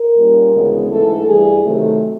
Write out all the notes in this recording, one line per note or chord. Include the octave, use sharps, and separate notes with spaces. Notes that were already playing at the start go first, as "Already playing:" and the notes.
Already playing: A#4
A#2 G3 A#3 C#4
D2 C#3 E3 G#3 B3
G#2 E3 A3 D4 A4
G2 E3 G3 G#4
C3 D#3 F#3 A3